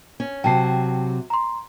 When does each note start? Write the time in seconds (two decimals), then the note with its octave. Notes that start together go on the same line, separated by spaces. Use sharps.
0.20 C#4
0.44 C3 F#3 G5 A5 C7
1.30 A#5 C6